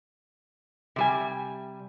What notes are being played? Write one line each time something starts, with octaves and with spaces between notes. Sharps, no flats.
C3 G3 G#5